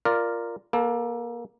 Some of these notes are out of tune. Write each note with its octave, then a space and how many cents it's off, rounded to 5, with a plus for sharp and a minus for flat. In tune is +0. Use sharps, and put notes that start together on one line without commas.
F4 -10 A#4 +0 D5 +0
A#3 +25 A4 +0